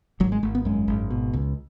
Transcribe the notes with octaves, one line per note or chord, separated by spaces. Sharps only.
G#1 F#3
G#3
G#1 A3
B3
F#2 G#3
G#1
B2
C#2